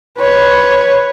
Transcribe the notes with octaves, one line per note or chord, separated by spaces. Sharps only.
B4 C#5